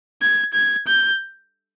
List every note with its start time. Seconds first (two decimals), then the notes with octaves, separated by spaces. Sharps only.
0.21 G#6
0.54 G#6
0.88 G6